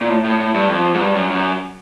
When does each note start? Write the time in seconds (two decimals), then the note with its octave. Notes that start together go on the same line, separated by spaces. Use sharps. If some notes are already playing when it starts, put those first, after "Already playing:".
0.01 A#2
0.09 A2
0.24 A2
0.40 A2
0.54 G2
0.69 F2
0.94 G#2
1.00 G2
1.15 F#2
1.30 F#2